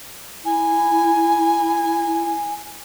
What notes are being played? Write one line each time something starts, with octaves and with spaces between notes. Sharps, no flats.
E4 G#5